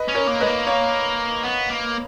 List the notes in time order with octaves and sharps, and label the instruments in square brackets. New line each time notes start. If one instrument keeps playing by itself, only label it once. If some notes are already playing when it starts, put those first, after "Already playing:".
Already playing: [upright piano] B4 D#5
[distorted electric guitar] C#4
[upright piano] A#4 C#5
[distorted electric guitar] A#3
[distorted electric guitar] G#3 [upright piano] B4 D#5
[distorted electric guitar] A#3
[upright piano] C#5 F5
[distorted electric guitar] B3
A#3